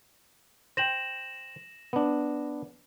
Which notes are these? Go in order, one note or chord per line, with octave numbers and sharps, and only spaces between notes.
C5 G5 A#6 E7 F#7
B3 D4